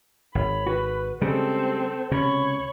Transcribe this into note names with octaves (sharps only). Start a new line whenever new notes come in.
G#1 C#5 B5
F#4 B4
C#3 G3 G#3 C4 A4 C5
C#2 C3 C#4 C#5 B5